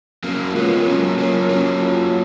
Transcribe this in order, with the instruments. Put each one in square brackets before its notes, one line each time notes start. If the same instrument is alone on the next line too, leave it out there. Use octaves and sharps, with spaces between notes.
[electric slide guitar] F#3 A#3 [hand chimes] C#4
[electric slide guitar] G#3 B3 [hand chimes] F4 A#4 C#5
[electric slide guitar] F#3 A#3 [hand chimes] C#4
[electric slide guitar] F#3 A#3 [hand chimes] F4 A#4 C#5
[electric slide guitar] F#3 A#3 [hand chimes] C#4
[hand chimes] F4 A#4 C#5